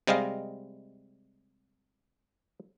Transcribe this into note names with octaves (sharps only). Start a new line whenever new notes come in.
C3 G3 G#3 D#5 F5